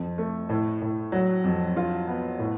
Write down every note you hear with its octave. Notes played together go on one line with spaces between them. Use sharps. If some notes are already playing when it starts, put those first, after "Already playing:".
Already playing: F2
A3
A2
A2
F#3
F2
F4
B3
A2